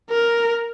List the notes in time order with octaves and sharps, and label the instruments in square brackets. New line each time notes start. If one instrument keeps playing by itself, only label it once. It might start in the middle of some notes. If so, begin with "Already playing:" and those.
[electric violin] A#4